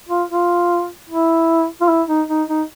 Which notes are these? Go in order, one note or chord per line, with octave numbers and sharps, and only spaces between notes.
F4
F4
E4
F4
E4
D#4
D#4
D#4